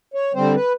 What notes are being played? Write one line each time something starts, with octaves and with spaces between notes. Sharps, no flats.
C#5
D3 G3 C4 C5
B4